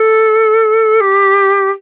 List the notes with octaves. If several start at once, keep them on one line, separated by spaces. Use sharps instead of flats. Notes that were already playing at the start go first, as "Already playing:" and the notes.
Already playing: A4
G4